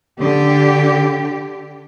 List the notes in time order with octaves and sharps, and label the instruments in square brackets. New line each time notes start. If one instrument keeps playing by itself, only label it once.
[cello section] D3 G4